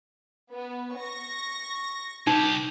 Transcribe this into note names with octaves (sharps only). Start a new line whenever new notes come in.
B3
C#6 A#6
C2 D#4 G4